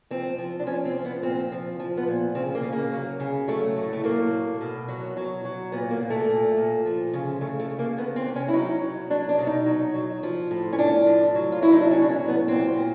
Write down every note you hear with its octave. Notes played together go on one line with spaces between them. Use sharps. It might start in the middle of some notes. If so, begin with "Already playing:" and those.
F3 C4
F3
D4
F3 C#4
C4
F3
B3
A#2 C4
F3
F3
B3
A#2
C#3 C4
A#3
C#3
A#3
F#3
C#3
F#3 A3
A2
A3
F#3 A#3
A2
B2
F#3
F#3
F#3
A#2 B3
A#3
A#2
A3
A#2
A#2
F3
C#3
C#3 A3
A3
C#3
A#3
D#3 B3
C4
C3
C#4
E4
F#3 D#4
F#3
F#3 D4
D4
B2
D#4
F#3
F#3
F3
A2
C#4
F3 D4
A2
F#3
F4
F#3 E4
D#4
D4
A2 C#4
D4
C#4
F#3
B3
A#2 C4
A#2